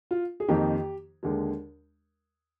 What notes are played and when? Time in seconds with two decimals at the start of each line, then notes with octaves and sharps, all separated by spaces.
0.11 F4
0.40 G#4
0.48 F2 D#3 A#3 D#4 G4
1.23 D#2 D3 G#3 D4